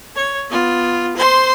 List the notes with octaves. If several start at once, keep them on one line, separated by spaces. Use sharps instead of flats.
C#5
B3 F4
C5 C6